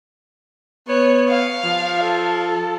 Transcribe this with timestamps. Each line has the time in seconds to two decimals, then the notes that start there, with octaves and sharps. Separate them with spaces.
0.88 B3 C#5
1.29 F5
1.64 F3
2.04 A4